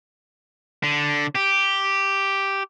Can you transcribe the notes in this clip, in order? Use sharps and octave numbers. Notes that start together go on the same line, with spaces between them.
D3
G4